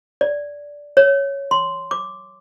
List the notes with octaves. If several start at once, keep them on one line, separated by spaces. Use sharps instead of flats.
D5
C#5
C6
D6